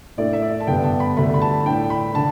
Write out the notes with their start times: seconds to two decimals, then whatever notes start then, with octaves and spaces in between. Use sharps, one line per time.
0.17 A2 A3 D4 D5
0.33 E5
0.42 D5
0.60 A5
0.67 G2 D3 G3 B3 D4 G5
0.84 A5
1.00 B5
1.17 D2 D3 A3 D4 B5
1.34 B5
1.42 A5
1.66 A2 A3 D4 G5
1.90 B5
2.15 D3 A5